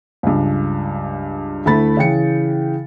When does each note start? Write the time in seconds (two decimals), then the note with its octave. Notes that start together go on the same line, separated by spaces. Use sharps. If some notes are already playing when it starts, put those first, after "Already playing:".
0.23 C#2 G2
1.65 D2 A3 E4 B5 A6
1.97 C#3 E3 G5 C#7